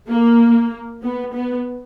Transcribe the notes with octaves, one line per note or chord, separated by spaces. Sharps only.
A#3
B3
B3